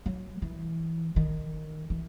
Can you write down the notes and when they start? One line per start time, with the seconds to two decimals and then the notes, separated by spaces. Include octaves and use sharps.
0.06 F#3
0.42 E3
1.16 D#3
1.90 E3